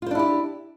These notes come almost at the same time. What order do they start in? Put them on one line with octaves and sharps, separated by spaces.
F4 C5 D4 E4 G4